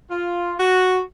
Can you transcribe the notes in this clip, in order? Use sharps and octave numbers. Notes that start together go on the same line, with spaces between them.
F4
F#4